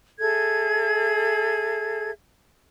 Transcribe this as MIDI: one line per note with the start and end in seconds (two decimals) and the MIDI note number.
0.20 2.11 68
0.20 2.11 69
0.20 2.11 76
0.20 2.11 92